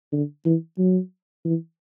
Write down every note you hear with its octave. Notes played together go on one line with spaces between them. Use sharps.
D3
E3
F#3
E3